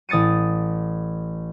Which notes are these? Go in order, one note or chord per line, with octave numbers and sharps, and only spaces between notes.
A1 D#6 A6 C#7 D#7